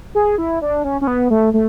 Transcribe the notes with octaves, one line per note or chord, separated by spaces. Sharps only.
G#4
E4
D4
C#4
C#4
B3
A3
A3